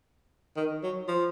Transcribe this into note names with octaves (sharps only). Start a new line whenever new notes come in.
D#3
F#3
F3